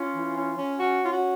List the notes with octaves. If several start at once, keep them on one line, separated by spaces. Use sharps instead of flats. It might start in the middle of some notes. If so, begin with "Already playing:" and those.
Already playing: C#4 F4
E3
C#4
C#4
C#4 F#4
C#4 F4
F#4